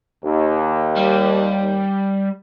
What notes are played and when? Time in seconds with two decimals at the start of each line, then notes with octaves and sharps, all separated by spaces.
0.24 D#2
0.96 G3